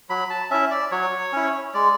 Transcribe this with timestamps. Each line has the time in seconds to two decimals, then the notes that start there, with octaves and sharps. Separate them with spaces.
0.09 F#3 B5
0.30 A5
0.51 C#4 E4 E5
0.71 D5
0.92 F#3 C#5
1.33 C#4 E4
1.74 G#3 D5